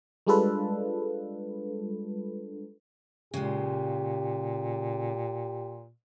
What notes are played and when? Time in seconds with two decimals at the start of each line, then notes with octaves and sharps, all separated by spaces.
0.27 G3 G#3 D4 F4 A4 B4
3.34 A#2 C#3 G#3 G4